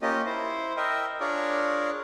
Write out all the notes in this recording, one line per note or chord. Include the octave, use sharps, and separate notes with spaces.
A#3 C#4 F4 G4 D#5
E4 C5
A#4 D#5 E5 G5
D4 F4 G#4 A#4 C#5 D5